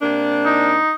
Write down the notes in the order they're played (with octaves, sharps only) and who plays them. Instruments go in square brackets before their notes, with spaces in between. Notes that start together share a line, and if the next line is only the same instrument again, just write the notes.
[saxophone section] C3 A#3 D4
[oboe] D#4